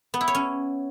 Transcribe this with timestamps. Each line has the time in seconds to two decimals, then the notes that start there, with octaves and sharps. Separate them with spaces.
0.14 B3
0.21 E4
0.28 C#5
0.35 C#4